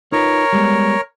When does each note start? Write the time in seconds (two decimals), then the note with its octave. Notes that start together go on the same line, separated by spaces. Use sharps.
0.12 D#4 F4 A#4 B4 C#5
0.53 G3 G#3 B3